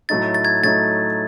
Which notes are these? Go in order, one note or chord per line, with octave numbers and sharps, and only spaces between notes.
A2 F#3 A3 D#4 A6
A6
G#6
A2 F#3 A3 D#4 A6